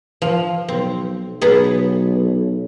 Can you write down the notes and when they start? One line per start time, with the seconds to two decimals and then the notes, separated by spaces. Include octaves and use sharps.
0.22 F3
0.69 B1 C4
1.42 B1 B3 D#4 G#4